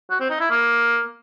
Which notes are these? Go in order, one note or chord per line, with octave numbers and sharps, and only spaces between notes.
F#4
C4
D#4
E4
A#3